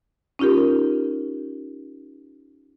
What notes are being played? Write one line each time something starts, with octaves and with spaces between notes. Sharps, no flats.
C#4 D#4 F4 G4 A#4